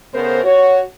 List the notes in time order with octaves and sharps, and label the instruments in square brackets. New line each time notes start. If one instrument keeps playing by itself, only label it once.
[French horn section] C#3 A3 B3 A#4 C5
F#4 C#5